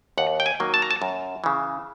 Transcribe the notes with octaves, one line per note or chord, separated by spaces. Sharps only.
D#2 F#5
G5
G#5
D#3 F#3 A#3
A5
A#5
A5
F#2
C#3 E3